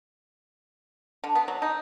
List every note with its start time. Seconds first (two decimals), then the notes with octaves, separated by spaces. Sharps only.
1.24 D3
1.35 B3
1.48 F#3
1.62 D#4